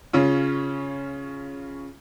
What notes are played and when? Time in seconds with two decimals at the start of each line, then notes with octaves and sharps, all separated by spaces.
0.13 C#3 C#4 F4